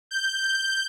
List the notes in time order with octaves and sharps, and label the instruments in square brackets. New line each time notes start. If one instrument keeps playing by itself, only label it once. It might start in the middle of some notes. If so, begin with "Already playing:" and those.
[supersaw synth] G6